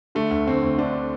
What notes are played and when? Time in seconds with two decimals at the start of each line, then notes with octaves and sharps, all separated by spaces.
0.15 D3 A3
0.31 D2
0.47 D2 C4
0.62 D2
0.78 D3 D4